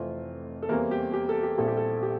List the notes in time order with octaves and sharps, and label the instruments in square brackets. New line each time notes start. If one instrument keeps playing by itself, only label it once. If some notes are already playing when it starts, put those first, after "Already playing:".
Already playing: [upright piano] F1 F2 E3 A3 C4 F4
A4
E2 E3 G3 A#3 C4 A#4
G4
G4
A4
G4
A#1 A#2 G3 C4 E4 A4
G4
A4
G4